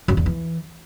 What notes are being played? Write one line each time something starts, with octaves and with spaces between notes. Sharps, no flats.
F#2
E2
E3